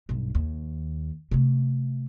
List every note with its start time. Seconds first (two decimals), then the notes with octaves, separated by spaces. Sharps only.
0.09 B1 G2
0.35 D#2
1.31 C3 A3